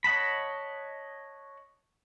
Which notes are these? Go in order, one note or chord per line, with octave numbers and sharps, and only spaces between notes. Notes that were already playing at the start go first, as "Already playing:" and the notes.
C#5 D#5 F#5 A5 B5